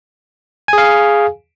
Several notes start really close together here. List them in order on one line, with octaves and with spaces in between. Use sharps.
G#5 G#4 F5